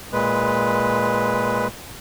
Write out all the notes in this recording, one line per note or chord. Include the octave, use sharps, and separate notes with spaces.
A#2 G#3 B4